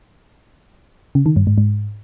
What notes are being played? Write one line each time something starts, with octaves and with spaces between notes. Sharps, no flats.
C#3
D#3
G2
G#2
G#2